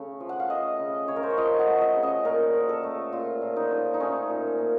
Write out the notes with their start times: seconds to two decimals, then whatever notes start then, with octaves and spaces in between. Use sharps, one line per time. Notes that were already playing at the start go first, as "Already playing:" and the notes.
Already playing: C#3 A3
0.20 F3
0.29 F#5
0.40 F5
0.50 A3 D#5
0.79 C#3
1.08 C#3 C#5
1.16 A#4
1.23 C5
1.30 C#5
1.37 F3 D#5
1.59 F#5
1.66 A3
1.81 D#5
1.96 C#3
2.03 D#5
2.24 A#2 A#4
2.54 F3
2.69 A4
2.83 A3
3.12 A#2 F4
3.42 A#2
3.56 D#4
3.71 F3
3.94 D#4
4.00 A3 C#4
4.30 A#2
4.58 A#2